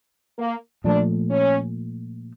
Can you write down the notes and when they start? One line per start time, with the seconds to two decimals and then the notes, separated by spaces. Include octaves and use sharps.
0.38 A#3
0.84 A#2 F3 A3 D4
1.30 C#4